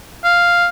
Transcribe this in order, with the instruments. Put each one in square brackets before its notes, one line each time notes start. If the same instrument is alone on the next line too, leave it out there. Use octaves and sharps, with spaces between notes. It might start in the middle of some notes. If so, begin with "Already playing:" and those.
[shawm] F5